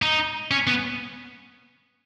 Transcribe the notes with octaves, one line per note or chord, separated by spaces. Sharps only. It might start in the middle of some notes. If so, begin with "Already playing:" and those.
D#4
C#4
B3